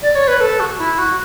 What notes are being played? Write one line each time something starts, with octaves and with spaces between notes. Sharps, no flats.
D5
C#5
B4
A4
F#4
E4
F#4